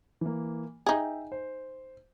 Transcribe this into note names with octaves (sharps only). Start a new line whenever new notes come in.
E3 A#3
D#4 G#4 E5 G5
C5